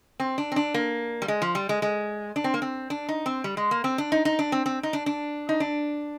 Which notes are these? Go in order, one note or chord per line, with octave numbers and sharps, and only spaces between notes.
C4
D4
C4
D4
A#3
G3
G#3
F3
G3
G#3
G#3
D4
C4
A#3
C4
D4
D#4
C4
G3
G#3
A#3
C4
D4
D#4
D#4
D4
C4
C4
D#4
D4
D4
D#4
D4